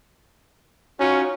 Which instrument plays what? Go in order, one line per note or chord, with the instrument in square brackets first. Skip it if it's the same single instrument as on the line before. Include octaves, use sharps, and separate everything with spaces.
[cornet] C#4 [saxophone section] D#4 F4 F#4